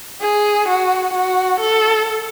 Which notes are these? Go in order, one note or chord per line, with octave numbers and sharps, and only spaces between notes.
G#4
F#4
F#4
A4